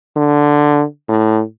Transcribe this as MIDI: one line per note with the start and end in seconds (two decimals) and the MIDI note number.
0.16 0.83 50
1.09 1.41 45